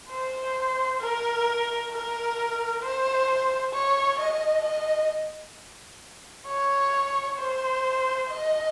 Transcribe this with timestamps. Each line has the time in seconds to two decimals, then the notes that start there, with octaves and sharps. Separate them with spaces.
0.10 C5
1.01 A#4
1.92 A#4
2.83 C5
3.74 C#5
4.19 D#5
4.65 D#5
6.47 C#5
7.38 C5
8.29 D#5